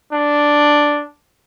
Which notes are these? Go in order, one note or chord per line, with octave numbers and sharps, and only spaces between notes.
D4